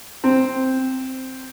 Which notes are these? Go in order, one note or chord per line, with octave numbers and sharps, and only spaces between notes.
C4